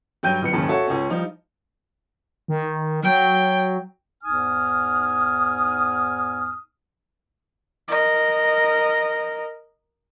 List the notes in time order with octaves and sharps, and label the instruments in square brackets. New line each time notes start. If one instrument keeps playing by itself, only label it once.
[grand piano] G2 F#3 G5 G6 D#7
D1 B1 C3 B4 C#7
F#1 D#2 G#2 C#3 A5 B5
F#4 A4 C#5 E5 F#5 A5
C#2 C#4
F3 G3 D#4
[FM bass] D#3
[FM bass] F#3 [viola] G5
[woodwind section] E2 G#2 D#4 G#5 D#6 F6
[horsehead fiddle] A#4 D#5